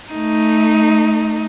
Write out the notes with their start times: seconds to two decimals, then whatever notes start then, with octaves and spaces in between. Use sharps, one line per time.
0.12 A3 D#4